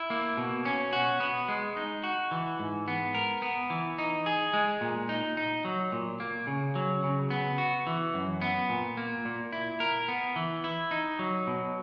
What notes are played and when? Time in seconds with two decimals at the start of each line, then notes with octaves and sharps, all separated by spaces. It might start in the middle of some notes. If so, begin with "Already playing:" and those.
Already playing: E4
0.10 A#3
0.37 B2
0.65 C#4
0.93 F#4
1.20 B3
1.48 G#3
1.77 D#4
2.04 F#4
2.31 E3
2.59 G#2
2.88 B3
3.15 A#4
3.42 B3
3.70 E3
3.98 D#4
4.26 G#4
4.53 G#3
4.81 A#2
5.09 D#4
5.37 D#4
5.65 F#3
5.92 A#2
6.20 A#3
6.47 C#3
6.75 F#3
7.04 C#3
7.30 B3
7.58 F#4
7.87 E3
8.14 F#2
8.42 B3
8.69 A#2
8.97 A#3
9.25 A#2
9.53 E4
9.80 A#4
10.08 B3
10.36 E3
10.64 E4
10.91 D#4
11.19 F#3
11.47 B2